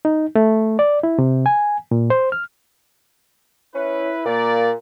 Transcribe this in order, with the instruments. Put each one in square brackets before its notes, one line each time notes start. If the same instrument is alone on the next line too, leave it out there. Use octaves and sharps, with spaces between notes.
[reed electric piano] D#4
A3
D5
E4
C3
G#5
A#2
C5
F6
[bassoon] C#4 [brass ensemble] E4 B4
[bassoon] A#2 [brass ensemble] A#3 D5